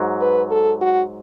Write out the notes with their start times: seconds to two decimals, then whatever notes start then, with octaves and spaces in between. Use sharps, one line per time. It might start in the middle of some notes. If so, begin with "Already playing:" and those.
Already playing: G#2 F#3
0.21 B4
0.51 A4
0.81 F#4